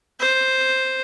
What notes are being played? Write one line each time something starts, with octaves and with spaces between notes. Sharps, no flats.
C5